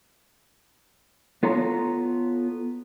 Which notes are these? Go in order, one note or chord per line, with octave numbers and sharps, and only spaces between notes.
B3 F4 A4 C#5 A#5